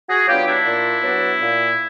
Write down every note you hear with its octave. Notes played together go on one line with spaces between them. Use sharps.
F#4 G#4
F#3 B3 D4 F4 G4
D4 E4
A#2
F#3 B3 D4
A#2